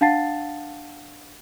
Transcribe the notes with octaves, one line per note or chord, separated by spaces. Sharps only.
D4 F5 F#5 A5 A6 C7